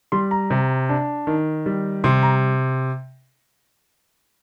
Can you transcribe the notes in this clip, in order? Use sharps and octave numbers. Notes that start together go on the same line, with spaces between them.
G3 C6
A#5
C3
D4
D#3
G3
C3 C6
A#5